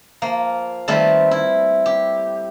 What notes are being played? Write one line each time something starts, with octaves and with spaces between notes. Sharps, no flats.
F3 A#3
D#3 G3 A3 C4 A4 B4
E4
G4